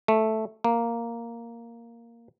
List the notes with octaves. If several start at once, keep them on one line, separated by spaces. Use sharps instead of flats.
A3
A#3